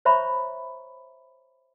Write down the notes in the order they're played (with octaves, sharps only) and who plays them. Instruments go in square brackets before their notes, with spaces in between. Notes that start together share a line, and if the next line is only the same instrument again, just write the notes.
[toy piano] C5 C#5 E5 A#5 B5 C#6